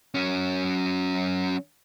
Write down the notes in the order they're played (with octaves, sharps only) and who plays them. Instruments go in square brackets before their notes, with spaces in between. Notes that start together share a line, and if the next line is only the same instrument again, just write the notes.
[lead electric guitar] F#3 C#4